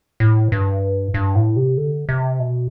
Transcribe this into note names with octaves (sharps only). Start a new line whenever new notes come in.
A2
G2
G2
A2
C3
D3
C3
B2